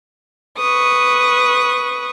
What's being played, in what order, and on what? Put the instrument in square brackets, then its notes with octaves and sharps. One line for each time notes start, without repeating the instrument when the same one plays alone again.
[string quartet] B4 C#6 D#6